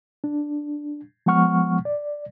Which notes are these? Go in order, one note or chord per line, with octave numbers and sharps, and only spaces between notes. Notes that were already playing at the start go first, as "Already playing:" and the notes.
D4
F3 G#3 B3 F#5 C#6 F6
D5